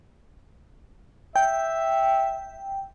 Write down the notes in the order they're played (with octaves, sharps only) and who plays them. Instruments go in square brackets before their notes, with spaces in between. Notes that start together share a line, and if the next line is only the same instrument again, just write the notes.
[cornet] E5 [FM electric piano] G5